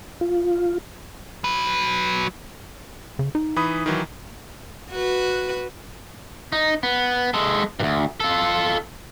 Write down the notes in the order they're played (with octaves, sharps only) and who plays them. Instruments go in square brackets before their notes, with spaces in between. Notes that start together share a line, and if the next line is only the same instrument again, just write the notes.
[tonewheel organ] F4
[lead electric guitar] F#3 B4
[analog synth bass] C#3
D#4
[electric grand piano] E3 B5 D#6
D#3 E3 F#3
[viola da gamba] F#4 B4
[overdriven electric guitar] D#4
B3
G#3 A4
D2 G2
F4 A4